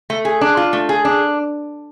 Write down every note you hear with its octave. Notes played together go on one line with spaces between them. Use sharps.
A3
G#4
D4
F4
A3
G#4
D4